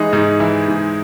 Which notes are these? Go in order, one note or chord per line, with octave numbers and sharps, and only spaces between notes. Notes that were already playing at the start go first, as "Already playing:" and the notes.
Already playing: E3 G#3 D#4 G#4
G#2 D#4
E3 E4
G#2